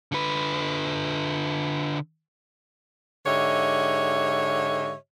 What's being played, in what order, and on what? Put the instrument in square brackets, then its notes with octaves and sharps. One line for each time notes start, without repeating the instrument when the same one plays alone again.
[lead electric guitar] D3 B4
[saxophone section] G#2 D3 G4 C#5 D#5 E5